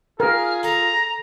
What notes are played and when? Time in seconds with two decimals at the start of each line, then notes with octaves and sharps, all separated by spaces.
0.20 F4 G#4 A#4 F6
0.63 A4 A#5